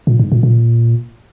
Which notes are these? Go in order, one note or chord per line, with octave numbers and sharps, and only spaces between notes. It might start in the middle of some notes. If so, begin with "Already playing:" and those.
A#2
G#2
A#2
A#2